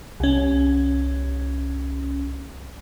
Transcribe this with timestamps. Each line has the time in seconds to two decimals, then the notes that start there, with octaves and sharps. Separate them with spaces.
0.20 C2 C#4